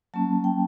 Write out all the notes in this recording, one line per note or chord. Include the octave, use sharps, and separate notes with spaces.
F#3 A#3 C#4 A5
G5